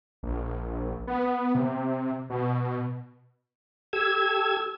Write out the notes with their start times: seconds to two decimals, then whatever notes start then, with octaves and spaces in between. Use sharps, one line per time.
0.23 A#1
1.07 B3
1.55 C3
2.30 B2
3.93 G4 A4 E6 G#6